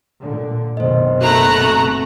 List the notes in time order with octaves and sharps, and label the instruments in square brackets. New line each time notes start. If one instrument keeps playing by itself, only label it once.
[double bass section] A#2 D3
[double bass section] F#1 B2 D#3 [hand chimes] C5 D#5
[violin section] A3 A#5 F#6 [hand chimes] F#4 A#4 B5
[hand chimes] C4 C#6